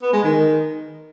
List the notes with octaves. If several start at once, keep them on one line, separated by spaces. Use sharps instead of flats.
B3
G#3
D#3